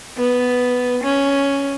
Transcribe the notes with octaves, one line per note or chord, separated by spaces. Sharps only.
B3
C#4